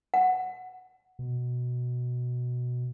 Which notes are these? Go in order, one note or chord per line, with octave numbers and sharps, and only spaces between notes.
F#5
B2